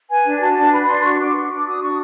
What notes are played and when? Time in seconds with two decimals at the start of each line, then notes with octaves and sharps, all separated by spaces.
0.09 B4 G#5
0.25 D4
0.41 F#4 A5
0.56 D4
0.72 B4 B5
0.87 D4 C6
1.04 F#4 C#6
1.19 D4 D6
1.35 B4 C#6
1.51 D4 D6
1.66 F#4 D#6
1.81 D4 C#6